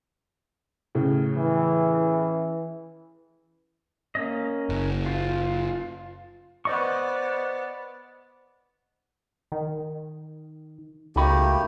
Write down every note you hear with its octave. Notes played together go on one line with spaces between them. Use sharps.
A2 C#3
E3
A#3 C#4 D#5
F#1
F4
B3 C5 D5 D#5 C#6
D#3
C#2 A3 A#3 D#4 F#4 G4 B5